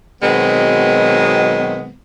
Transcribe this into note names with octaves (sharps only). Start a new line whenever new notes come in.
B2 D#3 F#3 G#3 B3 C4